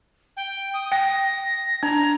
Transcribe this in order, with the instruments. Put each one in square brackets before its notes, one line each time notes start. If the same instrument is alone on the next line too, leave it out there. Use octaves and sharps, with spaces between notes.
[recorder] G5
D#6
[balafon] G5 [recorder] A#6
[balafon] D4 [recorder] A#5